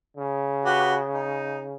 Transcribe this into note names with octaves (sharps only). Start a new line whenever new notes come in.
C#3
F#4 G4 B4
D#4